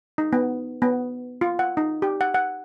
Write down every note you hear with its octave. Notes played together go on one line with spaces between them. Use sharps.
D#4
B3
B3
F4
F#5
D#4
G4
F#5
F#5